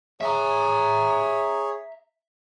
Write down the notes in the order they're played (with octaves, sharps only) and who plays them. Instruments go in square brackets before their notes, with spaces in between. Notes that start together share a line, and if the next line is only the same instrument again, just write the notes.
[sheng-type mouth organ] G#4 C#5 [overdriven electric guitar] E5 A#5